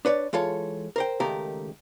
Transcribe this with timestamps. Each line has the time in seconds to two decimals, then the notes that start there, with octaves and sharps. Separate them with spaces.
0.05 D4 B4 C#5 D5
0.33 E3 G#3 F4 A4 C#5
0.96 A#4 C5 G5
1.20 C#2 D#3 A3 G4 A#4 A#5